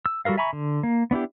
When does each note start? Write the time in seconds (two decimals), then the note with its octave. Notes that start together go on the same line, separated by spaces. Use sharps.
0.06 E6
0.25 G3 F#4 A4 A#4 F5
0.37 E5 G#5 A#5 B5 C#6
0.53 D3
0.83 A#3
1.11 B3 D4 E4 G4